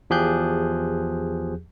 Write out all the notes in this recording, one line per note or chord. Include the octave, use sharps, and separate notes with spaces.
E2 F3 G4 G#4 F#6 G6